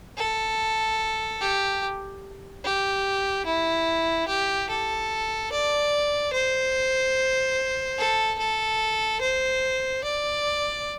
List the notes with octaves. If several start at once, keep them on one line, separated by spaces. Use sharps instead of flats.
A4
G4
G4
E4
G4
A4
D5
C5
A4
A4
C5
D5